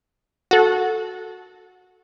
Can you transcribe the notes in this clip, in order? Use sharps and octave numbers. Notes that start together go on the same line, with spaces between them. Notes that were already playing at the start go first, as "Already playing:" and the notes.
F#4 A4